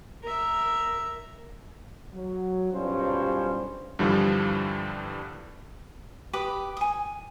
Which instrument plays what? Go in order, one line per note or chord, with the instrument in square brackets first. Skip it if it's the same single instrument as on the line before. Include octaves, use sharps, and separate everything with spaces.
[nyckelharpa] A#4 E5
[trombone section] F#3
B1 G2 G3 C#4 F4 C5
[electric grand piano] G2 D3 E3 F3 G3
[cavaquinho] G4 B4 D6 D#6
G#5 D#6